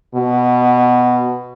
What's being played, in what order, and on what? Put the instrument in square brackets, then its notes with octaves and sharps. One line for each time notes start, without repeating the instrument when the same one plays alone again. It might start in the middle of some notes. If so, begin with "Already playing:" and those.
[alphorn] B2